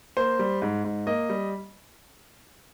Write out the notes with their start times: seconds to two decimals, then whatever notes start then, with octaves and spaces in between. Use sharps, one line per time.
0.17 A#3 C5
0.39 G3
0.62 G#2
0.84 G#2
1.07 A#3 D#5
1.29 G3